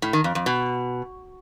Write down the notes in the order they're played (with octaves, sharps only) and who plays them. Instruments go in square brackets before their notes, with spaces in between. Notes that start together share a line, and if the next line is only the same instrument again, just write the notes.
[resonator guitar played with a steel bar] A2
D#3
F2
F2
B2